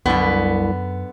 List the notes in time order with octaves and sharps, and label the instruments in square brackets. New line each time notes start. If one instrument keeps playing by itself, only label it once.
[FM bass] C2 [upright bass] F#2 [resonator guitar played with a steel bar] D3 B3